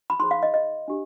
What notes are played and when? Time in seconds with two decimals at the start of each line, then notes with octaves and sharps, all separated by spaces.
0.10 B5
0.20 D#4 G#4 C5 C6
0.31 F5
0.43 D#5
0.54 D#5
0.88 D4 G4